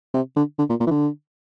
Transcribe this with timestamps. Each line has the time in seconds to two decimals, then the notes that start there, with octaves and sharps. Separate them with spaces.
0.14 C3
0.36 D3
0.59 D3
0.69 A#2
0.80 A#2
0.87 E3
0.91 D3